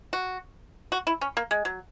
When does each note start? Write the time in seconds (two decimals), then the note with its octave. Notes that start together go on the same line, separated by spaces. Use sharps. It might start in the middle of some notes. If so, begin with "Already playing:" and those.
0.13 F#4
0.92 F#4
1.07 E4
1.21 C#4
1.37 A#3
1.51 G#3
1.65 F#3